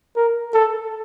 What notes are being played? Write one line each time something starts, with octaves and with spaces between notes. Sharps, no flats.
A#4
A4